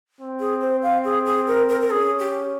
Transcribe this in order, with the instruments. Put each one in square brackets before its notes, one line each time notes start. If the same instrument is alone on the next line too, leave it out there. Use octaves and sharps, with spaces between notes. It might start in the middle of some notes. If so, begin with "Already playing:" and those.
[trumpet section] C4
[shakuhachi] G#4
C5
F5
G#4
G#4
A#4
A#4
A#4
[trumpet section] C#4 [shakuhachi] G#4
[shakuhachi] G4